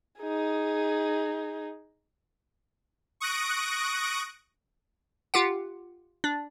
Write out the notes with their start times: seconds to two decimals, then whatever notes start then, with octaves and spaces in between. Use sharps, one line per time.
0.21 D#4 G#4
3.20 C#6 D#6 F#6 A#6 D7
5.34 F4 G4 F#5
6.24 D4